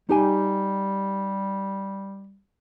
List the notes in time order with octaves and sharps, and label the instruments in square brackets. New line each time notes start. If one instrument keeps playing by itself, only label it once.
[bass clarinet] G3 [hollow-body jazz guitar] D#4 G4 G#5